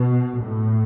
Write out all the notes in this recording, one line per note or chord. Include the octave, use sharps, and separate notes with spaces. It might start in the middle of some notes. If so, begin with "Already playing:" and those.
Already playing: B2
A2